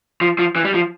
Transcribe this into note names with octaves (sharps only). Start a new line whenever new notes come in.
F3
F3
E3
G3
F3